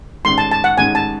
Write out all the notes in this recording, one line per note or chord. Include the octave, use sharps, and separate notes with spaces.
A1 G#2 D#3 C6
A5
A5
F#5
A1 G#2 D#3 G#5
A5